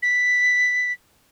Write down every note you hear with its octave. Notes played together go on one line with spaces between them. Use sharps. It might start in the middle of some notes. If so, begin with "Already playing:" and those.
B6